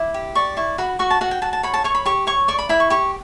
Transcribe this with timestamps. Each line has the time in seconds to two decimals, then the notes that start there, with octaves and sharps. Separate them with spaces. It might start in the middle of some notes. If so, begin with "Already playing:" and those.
Already playing: E4 D6
0.14 G4
0.35 D5 C#6
0.57 E4 C#6
0.78 F#4 B5
0.99 F#4 C#6
1.10 A5
1.21 F#4 F#5
1.31 G5
1.42 F#4 A5
1.53 A5
1.63 C#5 B5
1.74 A5
1.84 C#5 C#6
1.95 B5
2.06 G4 C#6
2.27 C#5 C#6
2.48 D5 C#6
2.59 B5
2.69 E4 B5
2.80 C#6
2.90 G4 C#6